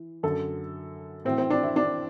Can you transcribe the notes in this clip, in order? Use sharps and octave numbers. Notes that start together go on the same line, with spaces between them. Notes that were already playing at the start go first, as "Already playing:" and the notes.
Already playing: E3
F#2 D3 A4
A2 E3 C4
C4
D4
E4
D4